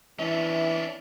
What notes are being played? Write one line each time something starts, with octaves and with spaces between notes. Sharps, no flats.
E3 C#4 D4 E5